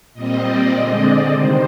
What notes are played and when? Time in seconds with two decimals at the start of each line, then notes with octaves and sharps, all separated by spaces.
0.14 A#2 G3 C4 D#5
0.43 D5
0.72 D3 G#3 C4 D#5
0.99 D5
1.29 C3 D#3 G3 C5